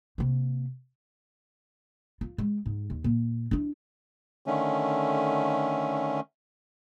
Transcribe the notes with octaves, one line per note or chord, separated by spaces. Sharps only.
C3 A#3
F4
G#3
G#2
D#2
A#2
D4 E4
D3 D#3 A3 C#4